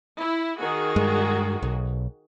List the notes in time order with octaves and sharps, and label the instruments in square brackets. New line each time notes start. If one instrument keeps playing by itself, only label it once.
[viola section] E4
D#3 F#4 G#4
[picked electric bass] G2 G#3
B1